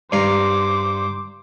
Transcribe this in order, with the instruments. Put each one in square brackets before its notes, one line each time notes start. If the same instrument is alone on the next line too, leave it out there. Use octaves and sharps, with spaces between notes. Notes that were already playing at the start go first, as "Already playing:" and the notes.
[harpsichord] G2 F5 A#5 [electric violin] C5 D6